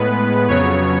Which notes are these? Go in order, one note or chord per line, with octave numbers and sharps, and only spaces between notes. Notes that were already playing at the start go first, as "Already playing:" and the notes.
Already playing: A2 G#3 B3 B4
F2 C#3 F#3 B3 C#5